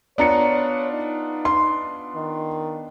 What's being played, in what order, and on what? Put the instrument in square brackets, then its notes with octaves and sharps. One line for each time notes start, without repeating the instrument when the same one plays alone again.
[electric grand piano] B3 D4 F4 [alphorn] C#5 [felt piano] D5 A#5 C#7
[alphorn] D#4
[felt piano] C6
[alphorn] D#3